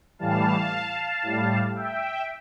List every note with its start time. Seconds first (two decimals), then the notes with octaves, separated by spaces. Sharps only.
0.18 A2 E3 G3 F5 A5
1.23 A2 G3
1.75 E5 G5